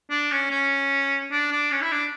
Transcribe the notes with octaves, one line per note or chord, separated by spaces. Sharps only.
D4
C#4
C#4
D4
D4
C#4
E4
D4